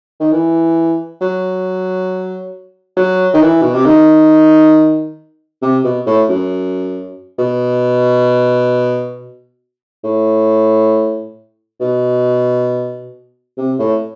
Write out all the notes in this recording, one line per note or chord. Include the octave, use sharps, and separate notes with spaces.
D#3
E3
F#3
F#3
D#3
E3
B2
C3
D#3
C3
B2
A2
F#2
B2
A2
B2
C3
A2